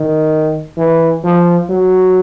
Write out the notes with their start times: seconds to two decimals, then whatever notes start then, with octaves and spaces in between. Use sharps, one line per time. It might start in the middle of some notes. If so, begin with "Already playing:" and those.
Already playing: D#3
0.78 E3
1.25 F3
1.70 F#3